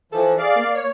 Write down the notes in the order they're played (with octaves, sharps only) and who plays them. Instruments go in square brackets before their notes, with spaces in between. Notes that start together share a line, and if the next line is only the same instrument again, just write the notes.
[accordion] E3 F3 [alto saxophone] A4
[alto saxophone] G#4 [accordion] D5 F5
[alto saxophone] A#3
[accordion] C#5